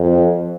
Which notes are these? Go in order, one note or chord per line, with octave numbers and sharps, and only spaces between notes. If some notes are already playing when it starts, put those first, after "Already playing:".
Already playing: F2